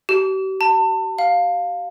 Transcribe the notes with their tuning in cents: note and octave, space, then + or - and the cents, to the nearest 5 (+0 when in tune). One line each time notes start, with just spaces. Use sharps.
G4 -45
A5 +30
F5 +10